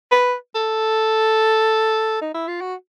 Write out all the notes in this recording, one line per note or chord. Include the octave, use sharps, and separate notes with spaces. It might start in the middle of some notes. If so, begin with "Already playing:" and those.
B4
A4
D#4
E4
F4
F#4